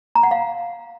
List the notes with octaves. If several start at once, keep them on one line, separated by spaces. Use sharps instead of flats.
A#5
F#5
F5